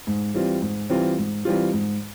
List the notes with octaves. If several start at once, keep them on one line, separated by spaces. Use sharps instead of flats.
G#2
E3 G3 C4 F4
G#2
E3 G3 C4 F4
G#2
E3 G3 C4 F4
G#2